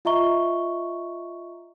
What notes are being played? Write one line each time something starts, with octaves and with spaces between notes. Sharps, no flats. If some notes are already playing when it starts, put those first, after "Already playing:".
F4 D#5 E5 A#5 C#6 G7